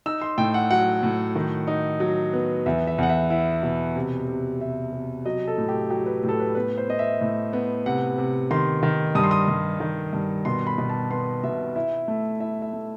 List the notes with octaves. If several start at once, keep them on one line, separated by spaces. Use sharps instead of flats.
D#4 E6
C6
A2 G5
F#5
F#3 F#5
A2
D#3
D#4
F#3
B3
E2 E5
E5
E2 F#5
E5
E4
B2
C3
C3
C3 E5
C3
F#3 D#5
A4
A2
G4
F#3 G4
B4
A2
A4
B4
B3 B4
C5
B3 D#5
E5
A2
B3
C3 F#5
C3
D#3 C6
D#3
G2 D#6
C6
D#6
G2
D#3
G2
B2 C6
B5
B2
A5
B3 C6
B2 E5
E4 E5
A3
E4 E5
E5
A3